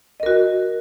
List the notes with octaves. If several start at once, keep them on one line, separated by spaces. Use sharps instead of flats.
F#4 A#4 D#5